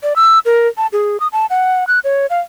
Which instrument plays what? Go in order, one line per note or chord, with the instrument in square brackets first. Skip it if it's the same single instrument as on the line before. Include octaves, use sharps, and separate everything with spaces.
[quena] D5
E6
A#4
A5
G#4
D#6
A5
F#5
F#6
C#5
F5